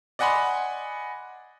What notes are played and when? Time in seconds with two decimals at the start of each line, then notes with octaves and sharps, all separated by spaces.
0.19 D5 D#5 F#5 G#5 B5 C6